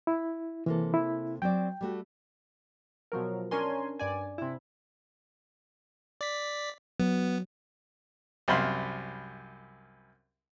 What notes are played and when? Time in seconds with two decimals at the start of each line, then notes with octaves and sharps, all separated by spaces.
0.07 E4
0.66 C3 E3 A#3 A4
0.94 E4
1.42 F#3 C4 D5 G5
1.81 G3 A3 F#4
3.12 B2 F3 F#3 A#4
3.51 C#4 D4 A#4 G#5 C6
3.99 G2 D5 G#5
4.38 C3 E4
6.21 D5 B6
7.00 F#3 B3
8.48 C2 F#2 C5 F5 B5 C6